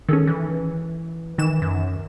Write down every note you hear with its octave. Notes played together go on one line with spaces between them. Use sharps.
D#3 G#3 C#4 A4
E3
D#3 E3 E7
F#2